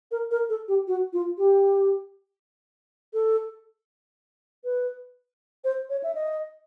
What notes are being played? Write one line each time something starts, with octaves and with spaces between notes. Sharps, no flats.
A#4
A#4
A4
G4
F#4
F4
G4
A4
B4
C5
C#5
E5
D#5